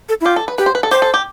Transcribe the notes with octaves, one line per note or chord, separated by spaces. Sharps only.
A4
E4
F4 G4
A4
B4
G4 B4
C5
B4
A4
G4 C5
A4
G4